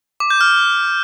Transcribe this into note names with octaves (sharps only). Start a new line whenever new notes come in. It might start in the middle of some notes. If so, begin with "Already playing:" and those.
D6
G6
F6